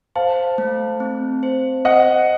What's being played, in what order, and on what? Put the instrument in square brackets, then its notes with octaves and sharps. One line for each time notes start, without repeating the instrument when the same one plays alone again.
[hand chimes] C5 [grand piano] F5 A5
[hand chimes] A3
C4
C5
[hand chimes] C5 [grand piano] D#5 F#5